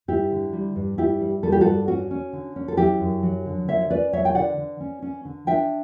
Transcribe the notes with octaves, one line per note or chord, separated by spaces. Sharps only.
G2 E4 G4
D3
G3
G2
G2 E4 G4
G3
G3 A4
G4
G2 F#4 A4
C#4 F#4
C#4
D3
C#4
A4
F#3 E4 G4
F#2
F#3
D3
D3 C#5 E5
C#5
C#4 B4 D5
F#3 C#5 E5
G5
D3 D5 F#5
D3
C#4
C#4
D3
D4 E5 G5